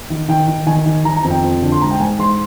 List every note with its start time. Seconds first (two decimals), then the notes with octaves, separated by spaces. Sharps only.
0.10 D#3
0.29 D#3 G5
0.48 D#3
0.66 D#3 G#5
0.86 D#3
1.05 D#3 A#5
1.17 A#5
1.24 F2
1.31 G5
1.44 F2
1.62 D3
1.72 C6
1.81 G#2 A#5
1.91 G5
2.00 G#2 G#5
2.19 G#2 C6